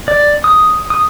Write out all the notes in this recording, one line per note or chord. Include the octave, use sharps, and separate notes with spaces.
D5
D#6
D#6